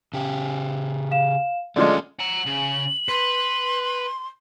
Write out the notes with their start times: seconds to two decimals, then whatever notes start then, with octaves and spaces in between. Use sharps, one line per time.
0.13 C#3 G4
1.11 F5 E7
1.76 D3 F3 G#3 A3 C#4 C#5 D5
2.19 F#5 A#5 F#7
2.46 C#3
3.08 B4 C6